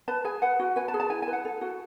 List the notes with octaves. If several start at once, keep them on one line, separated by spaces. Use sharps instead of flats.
B4 A5
G#4 G#5
B4 F#5
F#4
B4 G#5
A5
G#4
A5
E4 G#5
G#5
B4
F#5
A4
F#4